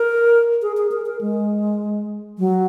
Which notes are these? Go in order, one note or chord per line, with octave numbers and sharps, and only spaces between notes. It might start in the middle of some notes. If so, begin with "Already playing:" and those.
Already playing: A#4
G#4
G#4
A#4
A#4
G#3
F#3